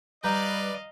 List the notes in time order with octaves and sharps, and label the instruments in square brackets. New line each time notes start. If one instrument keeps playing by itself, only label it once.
[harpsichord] G3 [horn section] B4 D5 [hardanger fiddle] D#5 F5 [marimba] A#5 G6